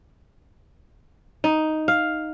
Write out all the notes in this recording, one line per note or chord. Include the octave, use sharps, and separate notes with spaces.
D#4
F5